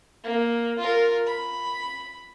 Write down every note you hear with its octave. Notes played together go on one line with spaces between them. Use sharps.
A#3
F4 A#4
B5